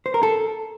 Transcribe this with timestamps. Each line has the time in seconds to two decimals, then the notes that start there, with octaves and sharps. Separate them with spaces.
0.06 C5
0.14 A#4
0.23 A4